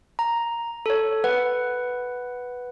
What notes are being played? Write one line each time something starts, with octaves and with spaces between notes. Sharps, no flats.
A#5
A4 C#5
B4 F#5